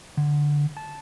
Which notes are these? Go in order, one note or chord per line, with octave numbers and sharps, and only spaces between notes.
D3
A5